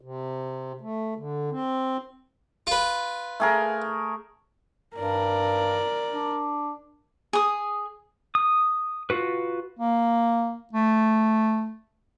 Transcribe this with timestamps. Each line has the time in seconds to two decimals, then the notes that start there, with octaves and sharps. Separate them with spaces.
0.01 C3
0.81 A3
1.17 D3
1.51 C4
2.67 F4 B4
3.40 A3 G#4 A#4
4.96 G2 A#4 D5
6.12 D4
7.33 G#4 D#6
8.35 D#6
9.10 F4 F#4 B4
9.79 A#3
10.73 A3